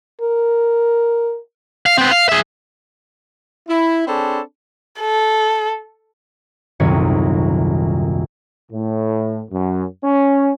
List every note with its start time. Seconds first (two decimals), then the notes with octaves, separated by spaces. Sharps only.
0.21 A#4
1.86 F5
1.97 B3 C4
2.11 F5
2.29 G#4 E5
3.69 E4
4.07 C4 D4 G#4 A4 C#5 B5
5.00 A4
6.80 D#1 C2 F#2 D#3 C#5 D#6
8.72 A2
9.51 F#2
10.04 C#4